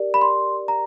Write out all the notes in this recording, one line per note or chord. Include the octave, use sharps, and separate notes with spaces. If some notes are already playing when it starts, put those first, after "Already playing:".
Already playing: G4 A#4 D5
B5
C6
A#5